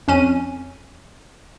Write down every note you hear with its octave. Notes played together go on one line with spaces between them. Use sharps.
F2 C#4 D#7